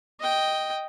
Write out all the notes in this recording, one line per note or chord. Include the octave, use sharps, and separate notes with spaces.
D#5 G5